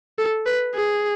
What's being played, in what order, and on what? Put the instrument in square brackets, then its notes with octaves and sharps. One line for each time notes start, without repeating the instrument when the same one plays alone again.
[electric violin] A4
B4
G#4